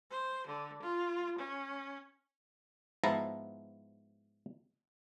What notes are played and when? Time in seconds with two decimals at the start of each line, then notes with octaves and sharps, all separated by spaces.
0.11 C5
0.47 D3
0.82 F4
1.38 C#4
3.04 G#2 F3 B3 E4 A5 A#5